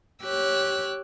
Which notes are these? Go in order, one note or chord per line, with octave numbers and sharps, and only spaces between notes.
G4 C#5 E6 F#6